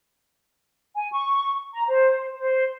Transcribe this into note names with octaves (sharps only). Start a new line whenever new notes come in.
G#5
C#6
A#5
C5
C5